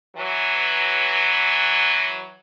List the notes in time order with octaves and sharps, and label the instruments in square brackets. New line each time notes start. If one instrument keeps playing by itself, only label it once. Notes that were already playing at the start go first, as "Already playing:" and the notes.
[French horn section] E3 F#3